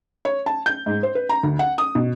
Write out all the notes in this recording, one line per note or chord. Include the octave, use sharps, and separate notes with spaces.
C#5
A5
G6
G#2
C5
B4
A#5
D2
F#5
D#6
B2